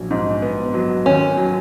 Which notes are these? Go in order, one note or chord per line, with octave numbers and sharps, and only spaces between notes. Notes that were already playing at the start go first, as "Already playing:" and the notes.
Already playing: A#1 F#3
G#2
B3
F#3
D#2 C#4
F#3